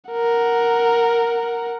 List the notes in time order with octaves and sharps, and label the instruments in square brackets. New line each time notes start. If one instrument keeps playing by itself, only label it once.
[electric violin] A#4 F#5